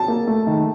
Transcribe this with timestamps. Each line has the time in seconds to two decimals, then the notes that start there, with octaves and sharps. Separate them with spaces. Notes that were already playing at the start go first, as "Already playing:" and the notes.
Already playing: A5
0.08 A#3
0.27 A3
0.47 D#3